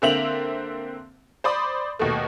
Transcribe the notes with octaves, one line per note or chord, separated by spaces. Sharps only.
D3 A#3 C4 E5 F7 F#7
C5 D5 B5 D#6
D#2 B2 A3